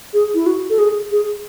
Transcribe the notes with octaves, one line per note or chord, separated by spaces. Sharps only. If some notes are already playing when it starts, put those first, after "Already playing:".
G#4
E4
F#4
A4
G#4
G#4